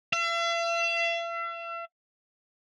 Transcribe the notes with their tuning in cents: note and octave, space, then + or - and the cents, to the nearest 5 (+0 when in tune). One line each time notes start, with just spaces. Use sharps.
E5 +45